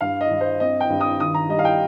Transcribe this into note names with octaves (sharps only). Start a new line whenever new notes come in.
G2 F5
D#5
G2
C5
C4 D#5
G5
G2
D#6
D#3 D#6
A#5
G3 D#5
F5
G5